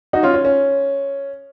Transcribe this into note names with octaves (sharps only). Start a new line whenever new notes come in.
D#4 F#4
C#4 F4
C#4
C#4